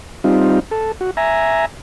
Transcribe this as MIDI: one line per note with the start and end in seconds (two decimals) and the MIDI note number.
0.24 0.59 55
0.24 0.59 60
0.24 0.59 63
0.24 0.59 65
0.71 0.92 69
1.01 1.11 66
1.17 1.65 76
1.17 1.65 80
1.17 1.65 82